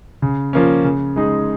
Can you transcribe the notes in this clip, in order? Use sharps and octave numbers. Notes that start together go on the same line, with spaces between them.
C#3
F3 A#3 C#4
C#3
G#3 D#4 G#4